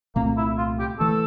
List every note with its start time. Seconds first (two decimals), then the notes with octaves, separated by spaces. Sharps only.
0.15 C2 A#2 A3 A#3 C4
0.37 E4
0.58 F4
0.79 G4
0.99 E3 A3 A4